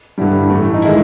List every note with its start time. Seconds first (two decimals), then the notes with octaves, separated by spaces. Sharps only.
0.18 G2 D3 G3 E4
0.50 A2 E3 A3
0.74 D#4
0.82 D#3 G#3 E4